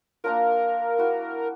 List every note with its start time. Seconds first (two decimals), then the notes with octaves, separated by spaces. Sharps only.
0.24 A#3 D4 F4 A#4
0.98 E4 F#4